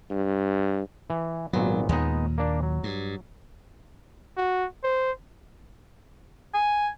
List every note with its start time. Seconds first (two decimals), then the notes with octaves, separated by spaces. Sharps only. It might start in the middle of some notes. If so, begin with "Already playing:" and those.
0.11 G2
1.10 E3
1.53 G#1 A#2 F#3 B3
1.89 D#2 A#2 G#3 B3 D#4
2.38 A#3 D4 D5
2.63 F#3
2.83 G2
4.37 F#4
4.84 C5
6.54 G#5